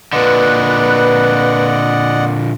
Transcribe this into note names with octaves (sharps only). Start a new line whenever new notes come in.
A#2 D3 B4 D5 D#5 F#5 F#6